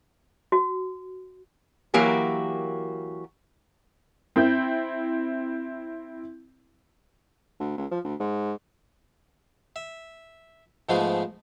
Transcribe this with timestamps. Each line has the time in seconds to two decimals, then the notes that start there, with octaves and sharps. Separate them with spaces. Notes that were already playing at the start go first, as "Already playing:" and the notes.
0.52 F#4
1.94 E3 F#3 A#3 F#4 G4 A#4
4.36 C4 E4 G6
7.60 D2
7.77 C#2
7.91 F3
8.04 D2
8.20 G#2
9.76 E5
10.89 G#2 F3 G#3 A3 B3 G#4